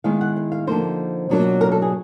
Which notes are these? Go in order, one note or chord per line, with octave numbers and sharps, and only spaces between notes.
D#3 G#3 B3 E4 F5
F#5
F5
F5
D3 F3 A#3 D#4 C5
B2 F#3 A#3 D4 F4
A#4
A4
G#4